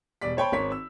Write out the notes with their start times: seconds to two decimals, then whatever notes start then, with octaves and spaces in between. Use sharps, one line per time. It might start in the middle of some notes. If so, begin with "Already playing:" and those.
0.22 E1 G3 D5 B6
0.37 C5 C#5 G5 A5 B5
0.52 G#1 C4 A#4 C#5 B6
0.72 E6